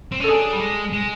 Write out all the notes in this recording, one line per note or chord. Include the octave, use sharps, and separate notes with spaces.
C4
C#4
A4
D4 G#4
G3
G#3
G#3